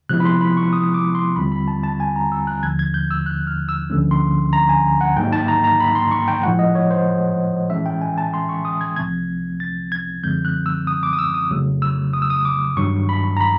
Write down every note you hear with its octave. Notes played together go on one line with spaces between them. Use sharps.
C3 F3 G#3 B3 E4 F#6
B5
C6
B5
C#6
D#6
D6
C6
D#2 D3 G3 C4 F4 B5
B5
A5
A5
G#5
A#5
E6
F#6
D#2 D3 F3 A3 G#6
G#6
G6
E6
F#6
F6
E6
D2 D3 F3 A3 C#4
C6
A#5
G#5
F#5
G#2 D#3 F#3 A#3 D#4 G5
A5
A#5
A#5
B5
C6
C#6
G5
A2 F3 G#3 F#5
D#5
C#5
C5
A2 E3 G#3 C#4 E5
G5
G#5
A5
C6
C#6
D#6
G#6
C2 C3 F3 A3 C4 G#6
A6
G#6
F#2 D3 F3 G#3 C4 G6
F#6
E6
D#6
D6
D#6
E6
D#6
F2 C#3 F#3 A3
E6
D#6
E6
D#6
D6
G2 D#3 F#3 C#6
B5
A#5
B5